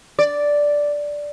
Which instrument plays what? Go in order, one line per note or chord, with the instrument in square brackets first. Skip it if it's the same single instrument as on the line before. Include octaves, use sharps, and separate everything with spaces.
[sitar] D5